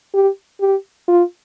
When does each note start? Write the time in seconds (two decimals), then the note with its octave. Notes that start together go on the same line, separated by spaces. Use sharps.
0.14 G4
0.61 G4
1.08 F4